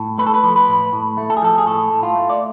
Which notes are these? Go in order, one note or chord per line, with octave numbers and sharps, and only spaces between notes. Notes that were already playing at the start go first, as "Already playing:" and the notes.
Already playing: A2
A3 B4
A4
B4
F3
B4
A2
A2
A3
A4
G#4
F3 A4
G#4
A2 A4
A2
F4
A3
D5